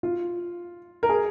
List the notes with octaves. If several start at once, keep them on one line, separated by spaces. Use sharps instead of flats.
F4
A#4
G#4